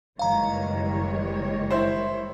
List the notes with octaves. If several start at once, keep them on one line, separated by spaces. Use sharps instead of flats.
F#1 D#3 E3 G3 G#3 C#5 F5 A#5
E4 C5